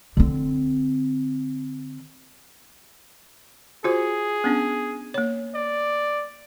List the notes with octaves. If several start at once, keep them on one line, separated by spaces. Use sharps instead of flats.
D3 C4
F4 F#4 G#4 C5
B3 C#4 D4
A#3 C#5
D5